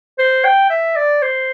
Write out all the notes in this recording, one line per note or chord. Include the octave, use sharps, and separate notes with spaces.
C5
G5
E5
D5
C5